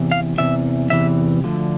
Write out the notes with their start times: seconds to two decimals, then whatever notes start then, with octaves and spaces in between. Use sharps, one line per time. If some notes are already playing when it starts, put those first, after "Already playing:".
Already playing: E2 C3 E3
0.12 F5
0.38 E2 C3 E3 E5
0.90 E2 C3 E3 E5
1.44 D2 D3 F3